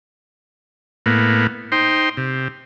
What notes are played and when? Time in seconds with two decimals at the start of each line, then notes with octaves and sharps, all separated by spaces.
1.06 A2 A#3 B3
1.72 D#4 C5 G5 C6
2.17 C3